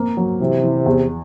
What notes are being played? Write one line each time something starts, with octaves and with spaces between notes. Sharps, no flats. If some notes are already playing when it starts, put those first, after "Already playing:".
Already playing: A#3 C4
F#3
C3 E3
E3
E2